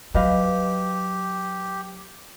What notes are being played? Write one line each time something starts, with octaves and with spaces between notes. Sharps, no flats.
F#3 G4 B4 D#5 F5